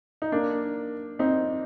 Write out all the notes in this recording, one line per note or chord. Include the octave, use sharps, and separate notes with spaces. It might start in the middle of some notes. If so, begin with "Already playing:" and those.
D#4
A#3 D4
C4 D#4